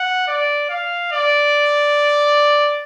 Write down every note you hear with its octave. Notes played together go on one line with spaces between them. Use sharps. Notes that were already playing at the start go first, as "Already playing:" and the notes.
Already playing: F#5
D5
F5
D5